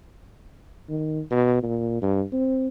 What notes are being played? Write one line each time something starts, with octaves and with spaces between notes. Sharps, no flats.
D#3
B2
A#2
G2
C4